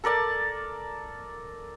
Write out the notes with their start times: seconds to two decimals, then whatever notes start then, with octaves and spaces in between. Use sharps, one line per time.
0.04 A4 A#4 D5 A5